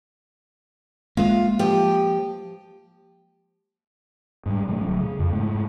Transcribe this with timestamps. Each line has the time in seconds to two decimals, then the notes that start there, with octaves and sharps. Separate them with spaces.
1.17 G#3 A#3 F4
1.59 F3 G4
4.46 G#2 G3
4.68 B2 F#3 A3
4.86 D1
4.99 C#3
5.19 F2
5.33 G#2 A3